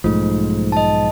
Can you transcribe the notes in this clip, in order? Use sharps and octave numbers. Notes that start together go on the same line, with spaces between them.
B1 G#2 F3 A3
D#5 A5